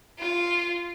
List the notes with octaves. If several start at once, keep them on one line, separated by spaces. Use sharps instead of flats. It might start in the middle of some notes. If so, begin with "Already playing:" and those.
F4